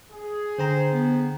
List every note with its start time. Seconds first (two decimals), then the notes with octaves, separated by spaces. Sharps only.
0.10 G#4
0.58 D3 C5 G5 A#5
0.92 B3